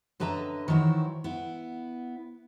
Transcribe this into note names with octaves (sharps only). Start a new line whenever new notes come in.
F#2 D3 B4 D#5 E5 A#5
D#3 E3 F#3 E4 C5
B3 E4